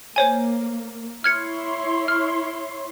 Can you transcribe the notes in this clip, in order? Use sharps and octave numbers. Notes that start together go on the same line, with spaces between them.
A#3 C5 C#5 G#5
E4 C#5 C6 F6 G#6 C#7
F6